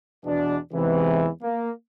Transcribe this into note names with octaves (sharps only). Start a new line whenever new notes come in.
E2 B2 D4
E2 G#2 C3 E3
A#3